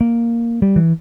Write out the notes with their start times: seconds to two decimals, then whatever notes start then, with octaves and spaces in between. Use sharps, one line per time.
0.01 A#3
0.62 G3
0.76 E3